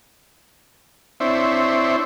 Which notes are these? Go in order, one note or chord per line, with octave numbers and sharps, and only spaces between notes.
C4 D4 E4 C5 C#5 E5